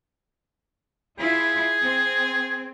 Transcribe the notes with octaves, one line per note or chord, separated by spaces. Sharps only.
E4 F4 G#4
C4